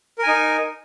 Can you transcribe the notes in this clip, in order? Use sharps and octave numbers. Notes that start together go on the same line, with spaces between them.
D#4 A#4 G#5